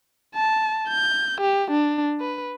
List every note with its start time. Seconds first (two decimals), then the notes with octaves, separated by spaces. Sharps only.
0.35 A5
0.89 G6
1.41 G4
1.71 D4
2.20 B4